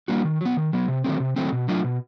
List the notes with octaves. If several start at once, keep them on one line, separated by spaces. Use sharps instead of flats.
G3 A#3 D4 F#4
D#3
F#3 B3
D#3
F#3 B3
C3
D#3 F#3 A3 C4
C3
D#3 F#3 A3 C4
B2
F#3 A3 D4 F4
B2